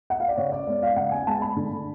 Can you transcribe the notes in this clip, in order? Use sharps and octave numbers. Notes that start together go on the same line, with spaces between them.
F#5
F5
D5
C#3 C#5
D5
G#3 B3 D5
F5
C#3 F#5
G#5
G#3 B3 A5
B5
D3